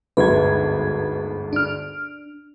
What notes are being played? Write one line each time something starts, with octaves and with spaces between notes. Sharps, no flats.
G1 D2 G#2 B4 G#6
D4 F6